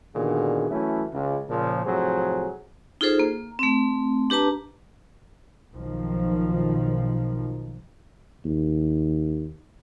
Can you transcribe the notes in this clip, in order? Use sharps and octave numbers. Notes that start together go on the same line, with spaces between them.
A#2 D3 D#3 B3 F#4 G#4
E3 F#3 A3 C#4 E4
C#2
A#2 C#3 F3
A2 C3 F3 F#3 G#4 C5
D#4 F4 G#4 A4 C5
A#3
A3 C4
D4 G4 B4 A5 A#5
B1 D#3 F3
D#2